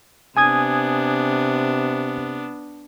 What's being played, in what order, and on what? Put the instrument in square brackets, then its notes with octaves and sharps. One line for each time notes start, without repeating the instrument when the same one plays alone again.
[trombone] C3 [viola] B3 D4 [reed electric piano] G#5 D#6 G#6